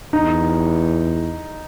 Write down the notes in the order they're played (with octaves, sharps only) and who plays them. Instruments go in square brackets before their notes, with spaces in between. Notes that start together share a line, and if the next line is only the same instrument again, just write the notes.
[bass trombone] E2 [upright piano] D#4